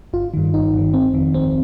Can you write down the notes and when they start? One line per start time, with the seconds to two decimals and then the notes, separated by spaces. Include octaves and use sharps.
0.13 G1 F4
0.34 G2 D#3
0.53 G1 D#4
0.74 G2 D#3
0.94 G1 C4
1.14 F2 D#3
1.34 G1 C4